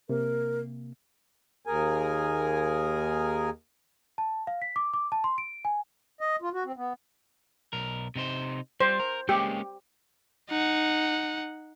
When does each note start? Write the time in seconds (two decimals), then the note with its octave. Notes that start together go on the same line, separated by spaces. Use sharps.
0.09 C3 A#3 A#4
1.66 D#2 G#4 A#4 G#5
4.18 A5
4.47 F5
4.62 B6
4.76 D6
4.94 D6
5.12 A5
5.24 C6
5.38 D7
5.65 G#5
6.21 D#5
6.42 F4
6.53 F#4
6.65 C4
6.77 B3
7.73 B1 A#4
8.16 C3 D#4 C5
8.80 G3 C5
8.99 A#4
9.29 G#3 A#3 C#4 G4
10.49 D#4 F#5